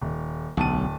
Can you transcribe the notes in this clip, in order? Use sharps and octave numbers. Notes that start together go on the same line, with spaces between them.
D#1
D1 B1 A5 D#7